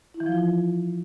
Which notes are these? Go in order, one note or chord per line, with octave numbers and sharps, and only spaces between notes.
E4
E3
F3
F4